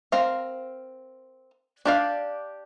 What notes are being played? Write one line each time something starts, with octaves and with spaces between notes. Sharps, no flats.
C4 A#4 F5
D4 G4 D5 F5